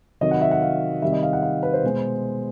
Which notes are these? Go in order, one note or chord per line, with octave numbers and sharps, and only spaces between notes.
C3 D#3 F#3 D#5
F#5
E5
F#5
F5
C3 D#3 G3 E5
D#5
F5
F#5
F5
B4
C5
B2 G#3